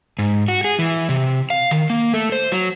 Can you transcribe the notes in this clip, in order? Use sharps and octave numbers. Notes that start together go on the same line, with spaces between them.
G#2
F#4
G#4
E3
C3
F5
D#3
A#3
A3
C5
F#3